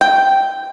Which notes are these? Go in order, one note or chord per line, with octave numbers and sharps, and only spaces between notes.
G5